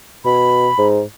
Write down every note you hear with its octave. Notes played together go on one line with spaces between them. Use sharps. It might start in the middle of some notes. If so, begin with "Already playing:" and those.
B2 B5
G#2